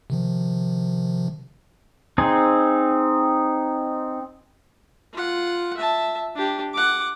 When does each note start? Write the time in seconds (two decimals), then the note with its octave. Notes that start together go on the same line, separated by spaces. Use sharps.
0.10 C3 D#3 F3
2.18 C4 D#4 G#4
5.13 F4 F#5
5.77 E5 A5
6.35 D4 G4
6.74 F#5 D6